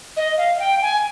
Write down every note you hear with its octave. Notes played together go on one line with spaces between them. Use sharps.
D#5
F5
F5
G5
G#5